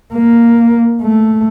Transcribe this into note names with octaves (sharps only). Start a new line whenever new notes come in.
A#3
A3